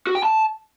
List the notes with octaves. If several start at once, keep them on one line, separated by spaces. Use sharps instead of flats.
F#4
G5
A5